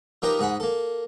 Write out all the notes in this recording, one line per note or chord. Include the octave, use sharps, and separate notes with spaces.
F3 A#3 D#4 G4 A#4 B4
G#2 G#4 F#5 B5
A#3 A4